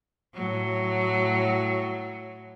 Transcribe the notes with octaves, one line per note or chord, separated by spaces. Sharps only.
A2 F#3